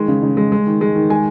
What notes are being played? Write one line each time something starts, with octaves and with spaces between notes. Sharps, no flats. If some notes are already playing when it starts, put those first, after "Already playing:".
Already playing: D#3 G#3
C#3
C#3
G#3
G#3
D#3
G#3
D#3
G#3 G#5